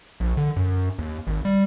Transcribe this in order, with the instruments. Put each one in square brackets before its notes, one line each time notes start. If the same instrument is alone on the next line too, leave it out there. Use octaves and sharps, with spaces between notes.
[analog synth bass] A#1
D3
F#2
D#2
G#1
G3